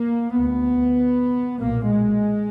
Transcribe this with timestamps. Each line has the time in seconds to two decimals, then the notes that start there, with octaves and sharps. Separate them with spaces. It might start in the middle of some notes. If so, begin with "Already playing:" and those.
Already playing: A#3
0.37 D2 B3
1.60 B1 A#2 A#3
1.91 G#3